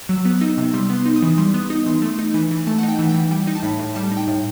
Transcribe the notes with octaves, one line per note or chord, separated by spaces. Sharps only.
F#3 E6
B3
D#4 E6
C3 E6
G3 C6
B3
C6
D#4
D#6
E3
G3 C6
B3 D#6
D#4 D#6
E3 C6
A3
D#4
E3
E3
A3 A5
D#4 F#5
G5
E3
G5
E3
G3 G5
D#4
A5
A2 B5
A2
G3 A5
D#4
G5
A2